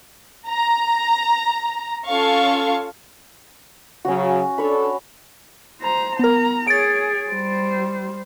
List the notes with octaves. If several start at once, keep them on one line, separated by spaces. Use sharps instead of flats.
A#5
C#4 F4 A4 F5 C#6
C#3 F#3 C#4 F#4
D4 A4 C#5 B5
C5 A#5
B3 A#4 A#5
G#4 C#5 A6 D7
G3 C5